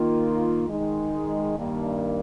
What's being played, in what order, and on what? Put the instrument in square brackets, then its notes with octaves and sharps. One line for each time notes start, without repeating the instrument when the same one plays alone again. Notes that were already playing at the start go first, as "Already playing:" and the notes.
Already playing: [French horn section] D#3 A#3 F4
D#3 G#3 D#4
G2 D#3 A#3